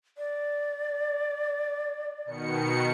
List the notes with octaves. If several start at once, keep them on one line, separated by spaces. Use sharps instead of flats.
D5
B2 D#3 C#7